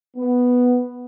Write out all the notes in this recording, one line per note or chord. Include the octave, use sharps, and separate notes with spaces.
B3